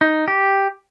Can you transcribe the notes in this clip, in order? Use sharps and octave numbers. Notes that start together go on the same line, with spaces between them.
D#4
G4